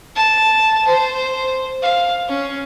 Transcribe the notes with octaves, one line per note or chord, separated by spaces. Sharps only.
A5
C5
F5
C#4